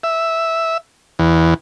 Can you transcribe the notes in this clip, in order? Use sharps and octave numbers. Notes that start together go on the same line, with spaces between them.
E5
E2